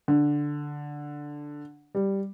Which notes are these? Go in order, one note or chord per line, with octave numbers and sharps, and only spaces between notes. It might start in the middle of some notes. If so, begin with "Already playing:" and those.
D3
G3